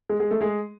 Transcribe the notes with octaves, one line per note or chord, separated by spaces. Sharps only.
G#3 G#4
G#3 G#4
A3 A4
G#3 G#4